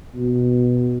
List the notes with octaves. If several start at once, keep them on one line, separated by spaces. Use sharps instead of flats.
B2